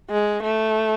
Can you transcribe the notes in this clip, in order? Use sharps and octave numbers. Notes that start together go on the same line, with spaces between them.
G#3
A3